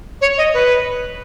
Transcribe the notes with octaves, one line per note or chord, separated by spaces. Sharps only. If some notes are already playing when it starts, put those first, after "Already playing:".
C#5
D#5
B4